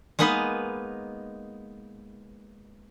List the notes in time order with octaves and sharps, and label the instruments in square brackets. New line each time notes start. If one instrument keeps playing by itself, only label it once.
[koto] G#3 A#3 B3 D#4 B4